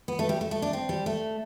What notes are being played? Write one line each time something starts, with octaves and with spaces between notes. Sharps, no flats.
B3
A3
G3
A3
A3
D4
C4
G3
A3